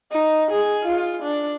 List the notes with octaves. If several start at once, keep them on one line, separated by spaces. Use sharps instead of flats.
D#4
G#4
F4
D4